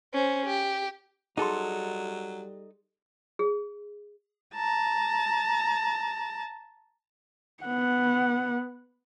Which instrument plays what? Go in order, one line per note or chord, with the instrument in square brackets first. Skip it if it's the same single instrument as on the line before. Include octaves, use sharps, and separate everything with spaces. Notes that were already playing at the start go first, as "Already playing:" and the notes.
[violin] C#4 C5
G4
[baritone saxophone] F#3 [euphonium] G3 [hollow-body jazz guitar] D#4 A4 [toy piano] G#4 C6
[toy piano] G#4
[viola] A5 A#5
[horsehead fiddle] B3 F#5